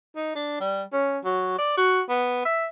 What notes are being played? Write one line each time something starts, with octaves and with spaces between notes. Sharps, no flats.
D#4
D4
G3
C#4
F#3
D5
F#4
B3
E5